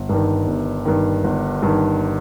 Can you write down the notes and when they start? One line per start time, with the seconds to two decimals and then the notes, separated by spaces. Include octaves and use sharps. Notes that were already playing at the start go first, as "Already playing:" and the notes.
Already playing: G1
0.09 G2 D#3
0.47 G1
0.85 G2 D#3
1.24 G1
1.62 G2 D#3